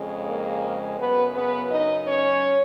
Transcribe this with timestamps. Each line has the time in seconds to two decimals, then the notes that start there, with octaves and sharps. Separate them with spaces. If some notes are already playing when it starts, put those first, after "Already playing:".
Already playing: F2 C#3 G#3
0.27 A#3 A#4
0.99 F#2 C#3 F#3 B3 B4
1.35 B3 B4
1.71 D#4 D#5
2.07 C#4 C#5